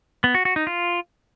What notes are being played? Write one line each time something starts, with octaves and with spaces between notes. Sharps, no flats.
B3
F#4
F#4
D#4
F4